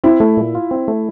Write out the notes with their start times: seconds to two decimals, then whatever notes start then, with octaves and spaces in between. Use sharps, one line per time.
0.04 C4 E4
0.20 A3
0.37 A#2
0.55 F4
0.71 C4
0.88 A3